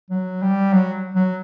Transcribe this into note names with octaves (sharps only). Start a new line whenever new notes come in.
F#3
G3
F#3
F#3